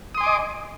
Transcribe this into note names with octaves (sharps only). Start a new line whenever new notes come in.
D#5 G#5 C6 D6 D#6